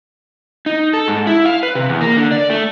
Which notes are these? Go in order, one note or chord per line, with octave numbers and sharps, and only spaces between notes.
D#4
A4
G#2
E4
F5
B4
C3
E2
A#3
D3
D5
A3